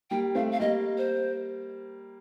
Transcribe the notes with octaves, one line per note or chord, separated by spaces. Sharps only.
G3 A#3 G5
A3 C4 F5
F5
G3 A#3 D#5
C5